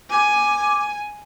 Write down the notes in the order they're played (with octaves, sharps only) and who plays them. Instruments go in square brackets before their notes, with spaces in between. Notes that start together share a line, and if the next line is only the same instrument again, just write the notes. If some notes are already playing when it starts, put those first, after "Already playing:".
[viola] G#5 [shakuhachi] D6